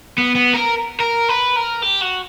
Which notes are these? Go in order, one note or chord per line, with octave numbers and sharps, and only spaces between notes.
B3
B3
A#4
A#4
B4
A#4
G4
F#4